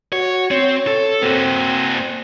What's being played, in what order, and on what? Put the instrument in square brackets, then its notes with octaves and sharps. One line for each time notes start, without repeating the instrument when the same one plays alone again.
[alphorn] F#4 [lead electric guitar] C#5
[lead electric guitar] C4 [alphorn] C#5
[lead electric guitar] A4
[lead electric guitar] A#3 F#4 [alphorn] C4